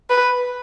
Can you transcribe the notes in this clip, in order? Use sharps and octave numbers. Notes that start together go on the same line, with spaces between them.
B4